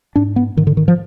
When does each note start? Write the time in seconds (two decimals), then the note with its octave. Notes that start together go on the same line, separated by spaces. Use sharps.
0.16 G#2 D4
0.36 B3
0.57 G#2 D#3
0.67 D3
0.77 D#3
0.88 F3